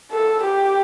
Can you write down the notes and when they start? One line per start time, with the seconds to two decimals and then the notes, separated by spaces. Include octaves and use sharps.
0.12 A4
0.43 G4